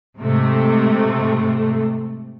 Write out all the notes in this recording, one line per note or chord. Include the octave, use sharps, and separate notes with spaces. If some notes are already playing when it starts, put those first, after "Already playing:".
G#2 C3 A3